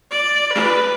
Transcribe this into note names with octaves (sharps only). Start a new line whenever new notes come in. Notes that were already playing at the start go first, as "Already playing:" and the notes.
D5
B4